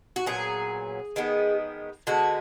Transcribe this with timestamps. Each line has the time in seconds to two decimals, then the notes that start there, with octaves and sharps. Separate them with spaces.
0.16 F#4
0.26 A#2 F#3 B3 G#4
1.16 D#3 G#3 B3
2.07 D3 G#3 B3 F#4